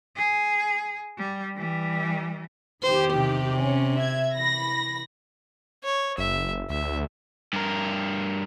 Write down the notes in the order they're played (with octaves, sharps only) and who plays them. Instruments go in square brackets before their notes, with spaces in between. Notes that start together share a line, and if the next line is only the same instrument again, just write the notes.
[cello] G#4
G3
E3 G3
[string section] E2 D#3 G4 [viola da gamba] C5
[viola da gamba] C3
[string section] C#4
E5 G#6
E3 B5 A#6
[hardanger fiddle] C#5
[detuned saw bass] F#1 [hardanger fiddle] E5
[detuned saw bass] D2 [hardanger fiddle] E5
[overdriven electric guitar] G2 A#4